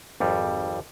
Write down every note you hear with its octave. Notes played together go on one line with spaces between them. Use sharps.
G#1 F2 G3